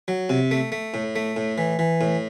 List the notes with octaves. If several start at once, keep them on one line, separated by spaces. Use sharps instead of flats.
F#3
C3
A3
A3
A2
A3
A2
E3
E3
A2